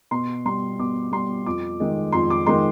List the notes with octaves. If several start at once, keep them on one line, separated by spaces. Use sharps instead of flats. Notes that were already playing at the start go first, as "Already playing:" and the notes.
B2 C6
G3 C6
B2 D6
G3 C6
F2 D6
D#3 G#3
F2 C6
D6
D#3 G#3 C6